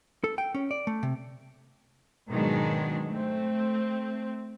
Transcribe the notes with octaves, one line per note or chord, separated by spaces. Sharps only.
A4
G5
C#4
D5
A3
C3
G#2 B2 D#3 F#3 G#3 D4
A3 C4